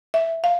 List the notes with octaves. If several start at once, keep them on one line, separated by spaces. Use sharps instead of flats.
E5
F5